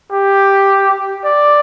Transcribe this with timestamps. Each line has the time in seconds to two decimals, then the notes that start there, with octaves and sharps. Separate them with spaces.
0.12 G4
1.24 D5